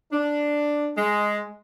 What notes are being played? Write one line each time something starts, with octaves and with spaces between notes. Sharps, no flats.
D4
G#3